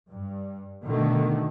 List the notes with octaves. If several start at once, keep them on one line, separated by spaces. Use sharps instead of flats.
G2
B2 D3 D#3 A3